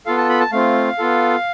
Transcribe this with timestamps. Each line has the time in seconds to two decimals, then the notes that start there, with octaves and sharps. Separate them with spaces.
0.06 B3 F4 A4 F5
0.17 A5
0.29 B5
0.40 A5
0.52 A3 C4 F4 F5
0.99 B3 F4 A4